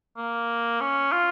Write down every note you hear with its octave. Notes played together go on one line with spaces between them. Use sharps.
A#3
C#4
F4